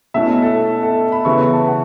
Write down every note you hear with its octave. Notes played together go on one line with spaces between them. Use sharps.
B2 A3 C#4 E4 E5
A4
A4
B5
C#3 E3 B3 E4 C#6
C#6
A5
F#5